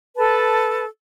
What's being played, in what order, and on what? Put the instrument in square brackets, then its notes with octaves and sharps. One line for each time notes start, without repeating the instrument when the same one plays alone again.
[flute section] A4 B4 A5